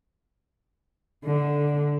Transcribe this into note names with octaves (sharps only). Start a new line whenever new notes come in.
D3